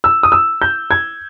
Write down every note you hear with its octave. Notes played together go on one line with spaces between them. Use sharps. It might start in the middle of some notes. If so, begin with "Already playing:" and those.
E6
D#6
E6
G6
G#6